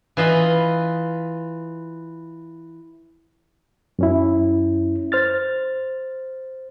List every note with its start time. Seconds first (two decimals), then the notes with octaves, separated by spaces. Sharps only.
0.17 E3 F4 D#5 B5
3.99 F#2 C#4 E4
5.12 C5 F6 A6